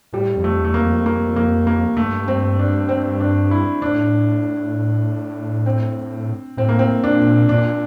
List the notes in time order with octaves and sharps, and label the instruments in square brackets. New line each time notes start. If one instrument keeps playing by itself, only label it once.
[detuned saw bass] A2 [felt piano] G3
[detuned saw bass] F2
[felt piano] A3
[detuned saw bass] E2 [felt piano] A3
[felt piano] A#3
[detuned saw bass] F2
[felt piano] A#3
A#3
A#3
[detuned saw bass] G2 [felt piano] A3
[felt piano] C4
D4
C4
D4
E4
[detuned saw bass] A2 [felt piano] D4
[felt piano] C4
[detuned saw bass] A2 [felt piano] C4
[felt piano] A#3
C4
[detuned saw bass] A#2 [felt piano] D4
[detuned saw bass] A#2 [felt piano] D4